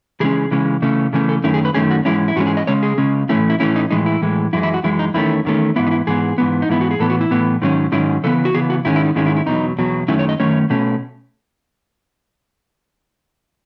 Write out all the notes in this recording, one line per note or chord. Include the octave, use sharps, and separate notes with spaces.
C#3 E3 G#3 C#4 G#4
C#3 E3 G#3 C#4
C#3 E3 A3 C#4
C#3 E3 A3 C#4
A4
F#2 D#3 A3 C#4 E4
G#4
B4
F#2 D#3 A3 C#4 G#4
F#4
G#2 E3 G#3 C#4 E4
E4
G#2 E3 G#3 C#4 F#4
G#4
D#5
C#3 G#3 C#4 C#5
G#4
C#3 G#3 C#4
A2 E3 A3 C#4 E4
E4
A2 E3 A3 C#4 E4
D#4
A2 E3 G#3 D#4
E4
A2 E3 G#3
F#2 E3 G#3 E4
E4
F#4
F#2 E3 G#3 E4
D#4
E2 D#3 A3 C#4 E4
E2 D#3 A3 C#4
G#2 E3 B3 E4
D#4
E4
G#2 E3 B3 G#4
G#2 E3 B3
D#4
G#2 E3 B3 E4
F#4
G#4
A2 E3 B3 A4
F#4
E4
A2 E3 B3
G#2 D#3 F#3 C#4
G#2 D#3 F#3 C#4 E4
C#3 E3 B3 A4
F#4
C#3 E3 B3 G#4
F#4
G#2 D#3 G#3 C#4 E4
E4
D#4
G#2 D#3 G#3 C#4 E4
E4
E4
E2 B2 F#3 D#4
E2 B2 F#3
F#2 D#3 A3 C#4 E4
C#5
D#5
F#2 D#3 A3 C#4 C#5
B2 A3 C#4